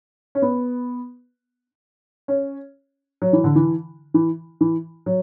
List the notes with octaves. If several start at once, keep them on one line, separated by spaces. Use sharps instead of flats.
C#4
B3
C#4
F#3
E3
D3
E3
E3
E3
F#3